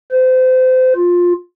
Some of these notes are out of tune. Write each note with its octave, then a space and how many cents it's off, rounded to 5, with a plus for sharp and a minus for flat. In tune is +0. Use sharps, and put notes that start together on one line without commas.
C5 -30
F4 +15